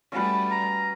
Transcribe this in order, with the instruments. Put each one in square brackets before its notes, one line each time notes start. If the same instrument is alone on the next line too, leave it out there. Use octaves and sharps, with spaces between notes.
[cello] G3 A3 [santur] C#4 F#4 B4
[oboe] A#5